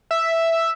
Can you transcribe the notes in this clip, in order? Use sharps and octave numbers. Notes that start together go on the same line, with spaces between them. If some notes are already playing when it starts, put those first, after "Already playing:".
E5